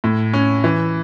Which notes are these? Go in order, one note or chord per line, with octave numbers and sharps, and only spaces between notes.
A2
C#4
E3